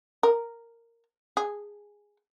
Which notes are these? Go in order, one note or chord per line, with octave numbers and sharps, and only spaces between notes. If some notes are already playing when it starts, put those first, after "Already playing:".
A#4
G#4